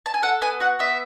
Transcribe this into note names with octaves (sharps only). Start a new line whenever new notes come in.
A5
G#5
A4 F#5
B3 G#5
F#4 F#5
B3 E5